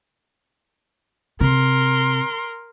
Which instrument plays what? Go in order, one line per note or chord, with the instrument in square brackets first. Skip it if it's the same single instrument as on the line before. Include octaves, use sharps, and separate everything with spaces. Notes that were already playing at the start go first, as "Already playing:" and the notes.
[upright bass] C3 [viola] A#4 C6